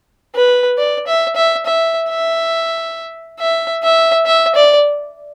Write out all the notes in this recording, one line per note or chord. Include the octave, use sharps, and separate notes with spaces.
B4
D5
E5
E5
E5
E5
E5
E5
E5
D5